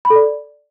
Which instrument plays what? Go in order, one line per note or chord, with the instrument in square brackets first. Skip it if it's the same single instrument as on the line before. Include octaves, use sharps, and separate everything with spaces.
[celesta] B5
A4
D5